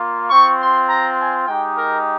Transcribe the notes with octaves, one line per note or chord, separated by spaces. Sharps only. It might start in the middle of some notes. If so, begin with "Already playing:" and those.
Already playing: A#3 F4
C4 F4 C#6
C6
A#5
G#5
G#3 D#4 G4 G5
A#4